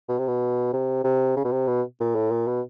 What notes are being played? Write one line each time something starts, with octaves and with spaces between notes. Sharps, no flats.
B2
C3
B2
C3
C3
C#3
B2
C3
B2
A#2
A2
A#2
B2